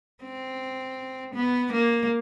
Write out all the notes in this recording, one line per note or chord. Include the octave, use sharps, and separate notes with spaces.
C4
B3
A#3